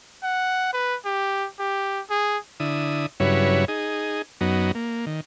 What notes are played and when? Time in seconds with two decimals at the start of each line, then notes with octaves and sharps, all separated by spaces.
0.23 F#5
0.73 B4
1.05 G4
1.59 G4
2.10 G#4
2.60 D3 E4 D#6
3.20 G2 C#3 F#3 E4 B4 C#5
3.68 D#4 G#4
4.41 F#2 F#3 B3 D#4
4.75 A#3
5.06 D#3